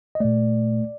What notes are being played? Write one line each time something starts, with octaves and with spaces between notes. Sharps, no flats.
D#5
A#2 A3 D5